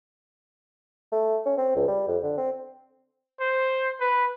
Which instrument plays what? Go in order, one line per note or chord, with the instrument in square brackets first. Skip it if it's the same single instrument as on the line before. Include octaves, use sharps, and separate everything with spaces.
[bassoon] A3
C#4
C4
C#2
G3
F2
D3
C4
[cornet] C5
B4